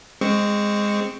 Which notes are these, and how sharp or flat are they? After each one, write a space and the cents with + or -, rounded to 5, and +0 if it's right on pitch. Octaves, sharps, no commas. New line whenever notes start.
G#3 -10 C4 +0 C#6 +0